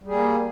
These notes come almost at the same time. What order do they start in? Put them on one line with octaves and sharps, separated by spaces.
G3 G#4 A#3